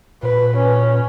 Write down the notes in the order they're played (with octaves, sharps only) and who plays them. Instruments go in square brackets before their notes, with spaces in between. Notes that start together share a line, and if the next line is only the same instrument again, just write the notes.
[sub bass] A#2 [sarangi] B4
[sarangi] C#4